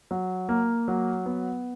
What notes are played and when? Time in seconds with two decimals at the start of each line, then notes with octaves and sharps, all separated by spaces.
0.11 F#3
0.49 A#3
0.88 F#3
1.26 B3